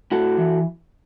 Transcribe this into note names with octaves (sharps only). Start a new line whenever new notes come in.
A2 F#4 A4
E3